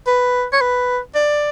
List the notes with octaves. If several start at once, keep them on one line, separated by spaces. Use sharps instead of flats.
B4
C#5
B4
D5